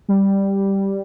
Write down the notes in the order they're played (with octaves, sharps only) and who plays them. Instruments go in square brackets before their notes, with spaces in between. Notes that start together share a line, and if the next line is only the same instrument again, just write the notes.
[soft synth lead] G3